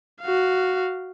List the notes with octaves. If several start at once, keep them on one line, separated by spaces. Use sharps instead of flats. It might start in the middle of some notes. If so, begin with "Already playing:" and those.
F#4 F5